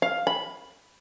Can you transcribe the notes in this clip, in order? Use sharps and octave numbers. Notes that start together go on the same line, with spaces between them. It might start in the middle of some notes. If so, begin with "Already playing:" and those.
F5
B5